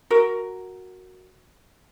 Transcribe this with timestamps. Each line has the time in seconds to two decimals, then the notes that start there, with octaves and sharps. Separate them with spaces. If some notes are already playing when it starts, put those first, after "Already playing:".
0.10 F#4 A#4